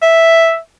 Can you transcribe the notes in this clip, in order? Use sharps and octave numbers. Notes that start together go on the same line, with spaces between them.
E5